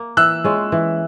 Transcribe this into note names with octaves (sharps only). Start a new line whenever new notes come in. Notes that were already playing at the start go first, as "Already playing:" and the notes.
Already playing: A#3
E3 E6 F#6
G#3 C#4 F4
E3